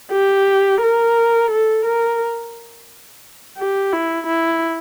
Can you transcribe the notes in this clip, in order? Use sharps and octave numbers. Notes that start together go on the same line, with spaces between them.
G4
A#4
A4
A#4
G4
E4
E4